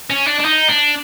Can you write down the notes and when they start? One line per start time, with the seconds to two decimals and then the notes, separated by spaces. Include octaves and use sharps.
0.10 C#4
0.27 D4
0.40 D4
0.45 D#4
0.70 D4